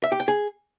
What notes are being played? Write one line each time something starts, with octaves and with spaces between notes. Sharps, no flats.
E5
G4
G5
G#4